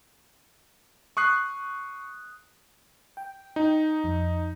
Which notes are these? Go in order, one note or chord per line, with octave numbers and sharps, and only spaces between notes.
C#6 D#6 F#6 C7
G5
D#4
F2